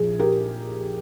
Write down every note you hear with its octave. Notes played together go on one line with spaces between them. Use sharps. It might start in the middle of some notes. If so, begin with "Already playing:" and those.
Already playing: A#1 G#4
G4 A#4